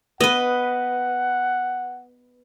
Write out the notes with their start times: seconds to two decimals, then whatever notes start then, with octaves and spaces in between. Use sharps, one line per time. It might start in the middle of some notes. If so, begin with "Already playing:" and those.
0.20 B3 B4 D#5 F#5